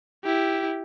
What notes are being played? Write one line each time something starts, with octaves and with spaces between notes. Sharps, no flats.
E4 G4